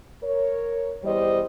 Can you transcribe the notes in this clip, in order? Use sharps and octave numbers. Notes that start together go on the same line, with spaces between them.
A#4 C#5
E2 G3 C5 D#5